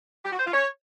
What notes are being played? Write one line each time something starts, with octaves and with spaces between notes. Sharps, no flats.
G4
F#4
C5
F4
C#5